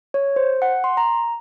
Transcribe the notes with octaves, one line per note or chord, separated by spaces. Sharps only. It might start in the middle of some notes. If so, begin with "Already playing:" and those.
C#5
C5
F#5
C6
A#5